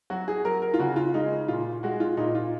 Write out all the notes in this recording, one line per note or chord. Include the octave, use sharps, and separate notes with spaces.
F#3 F#4
G#4
F#3 A#4
A#4
F4
C#3 F#4
F4
G#3 D#4
A#2 F4
G#3 F#4
F4
A#2 D#4
F4